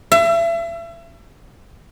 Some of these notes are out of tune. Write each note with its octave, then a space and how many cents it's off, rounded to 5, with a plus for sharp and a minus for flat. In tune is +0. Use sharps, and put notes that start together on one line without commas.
E5 +35